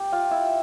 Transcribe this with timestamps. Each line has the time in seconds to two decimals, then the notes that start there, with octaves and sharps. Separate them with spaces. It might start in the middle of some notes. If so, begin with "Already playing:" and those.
Already playing: A#3 C4 G4 G5
0.12 F4 F5
0.31 E4 E5